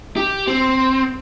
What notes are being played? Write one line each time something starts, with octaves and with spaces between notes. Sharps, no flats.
G4
C4